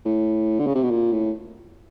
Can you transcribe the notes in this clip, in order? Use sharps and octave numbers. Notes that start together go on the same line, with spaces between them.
A2
D3
C#3
C3
B2
A#2
A2